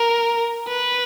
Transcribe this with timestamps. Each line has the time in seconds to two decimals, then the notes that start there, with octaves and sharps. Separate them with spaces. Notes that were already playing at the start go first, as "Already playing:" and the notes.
Already playing: A#4
0.68 B4